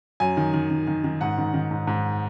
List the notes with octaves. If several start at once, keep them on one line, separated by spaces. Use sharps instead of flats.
F#2 G#5
D#3
D#3
D#3
D#3
D#3
G#2 F#5
D#3
D#3
G#2
G#2